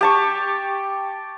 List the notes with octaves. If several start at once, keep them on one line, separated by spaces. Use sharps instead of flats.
G4 A5 C#6